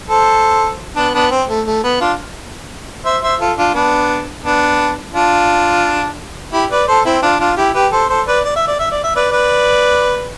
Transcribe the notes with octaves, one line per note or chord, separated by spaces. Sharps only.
A4 C5
B3 D4
B3 D4
C4
A3
A3
B3
D4 F4
C5 E5
C5 E5
F4 A4
D4 F4
B3 D4
B3 D4
D4 F4
E4 G4
B4 D5
A4 C5
C4 E4
D4 F4
D4 F4
E4 G4
G4 B4
A4 C5
A4 C5
B4 D5
D5
E5
D5
E5
D5
E5
B4 D5
B4 D5